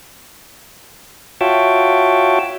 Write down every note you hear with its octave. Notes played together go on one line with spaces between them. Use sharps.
F4 F#4 C#5 E5 G5 A5